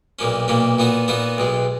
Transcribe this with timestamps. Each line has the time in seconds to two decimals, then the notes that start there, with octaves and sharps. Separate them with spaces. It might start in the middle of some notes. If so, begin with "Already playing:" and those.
0.19 B1 A#2 F3 A#3 C#4
0.48 B1 A#2 F3 A#3 C#4
0.79 A#2 F3 B3 D#4 F#4
1.08 A#2 F3 B3 D#4 F#4
1.38 B1 B2 G#3